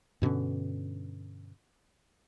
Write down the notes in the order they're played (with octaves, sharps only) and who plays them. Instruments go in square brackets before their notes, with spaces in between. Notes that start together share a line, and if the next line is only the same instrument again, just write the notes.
[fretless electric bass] G2 B2 D3 C#4